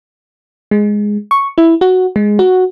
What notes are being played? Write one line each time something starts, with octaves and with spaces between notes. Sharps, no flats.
G#3
C#6
E4
F#4
G#3
F#4